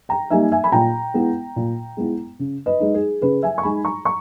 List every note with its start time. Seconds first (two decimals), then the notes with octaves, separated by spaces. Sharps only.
0.09 G5 A#5
0.30 G3 A#3 D#4 E5 G#5
0.52 E5 G#5
0.64 B5
0.72 A#2 G5 A#5
1.14 G#3 B3 E4
1.56 A#2
1.97 G#3 B3 E4
2.39 C#3
2.66 B4 D#5
2.80 G#3 D#4
2.94 G#4
3.22 C#3 G#4 B4
3.43 E5 G#5
3.58 C#6
3.63 G#3 D#4 G#5 B5
3.85 A#5 C#6
4.05 A#5 C#6